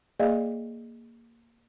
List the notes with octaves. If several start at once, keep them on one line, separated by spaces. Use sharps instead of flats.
A#3 G#4 D5 D#5 F5